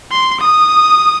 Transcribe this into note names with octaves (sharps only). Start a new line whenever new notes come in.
C6
D#6